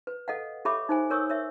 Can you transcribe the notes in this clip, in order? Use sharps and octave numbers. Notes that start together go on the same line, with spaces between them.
B4
A4 D#5 F5 F#5
G4 A4 C#5 E5 B5 D6
D#4 C5 G#5
A#4 C#5 C#6 D#6 E6
C#5 E5